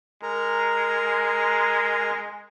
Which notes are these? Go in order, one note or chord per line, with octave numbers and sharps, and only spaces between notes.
G#3 A#4 A#5